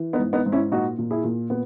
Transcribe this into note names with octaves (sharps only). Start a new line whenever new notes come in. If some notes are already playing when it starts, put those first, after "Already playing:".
Already playing: E3
B3 D#4
G#2
B3 D#4
G#2
C#4 E4
A#2 D#4 F#4
A#2
E4 G#4
A#2
A#2 B3